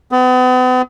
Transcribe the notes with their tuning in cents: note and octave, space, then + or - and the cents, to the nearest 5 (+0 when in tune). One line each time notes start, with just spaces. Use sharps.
B3 +40